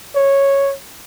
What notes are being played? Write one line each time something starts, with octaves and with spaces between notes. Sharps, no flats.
C#5